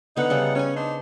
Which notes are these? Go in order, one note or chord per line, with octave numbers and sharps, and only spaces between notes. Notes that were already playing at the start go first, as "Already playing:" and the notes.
D3 B3 D#4 F#5
C#3 G3 A4
C#4 C#5 G#5
D4 D#4 C5